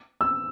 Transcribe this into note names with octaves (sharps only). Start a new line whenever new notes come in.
E6